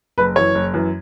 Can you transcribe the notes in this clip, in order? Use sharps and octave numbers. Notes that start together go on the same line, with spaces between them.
F#1 B4
F#2 E3 C#5
F#1
F#2 E3